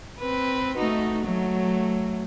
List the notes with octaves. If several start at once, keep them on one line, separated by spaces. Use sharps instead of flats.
C4 B4
A3 D#4 F#4
F#3 A3